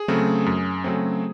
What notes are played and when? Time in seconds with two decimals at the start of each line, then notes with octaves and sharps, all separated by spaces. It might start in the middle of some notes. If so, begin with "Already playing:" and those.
Already playing: G#4
0.08 C#3 F#3 A3 C4
0.46 F#2
0.84 C#3 F#3 A3 C4